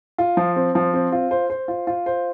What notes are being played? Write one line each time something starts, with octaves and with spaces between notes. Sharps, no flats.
F4
F3
C4
F3
C4
F4
C5
C5
F4
F4
C5